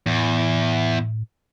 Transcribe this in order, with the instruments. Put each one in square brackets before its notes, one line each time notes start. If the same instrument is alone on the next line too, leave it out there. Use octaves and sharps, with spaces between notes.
[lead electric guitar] E2 [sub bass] A2